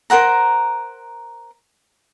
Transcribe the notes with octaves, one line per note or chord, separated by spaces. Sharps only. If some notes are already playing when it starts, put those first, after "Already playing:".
A#4 C5 F#5 A#5